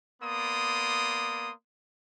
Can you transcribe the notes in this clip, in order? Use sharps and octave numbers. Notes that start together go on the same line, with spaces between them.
A#3 B3 D5 C6 D#6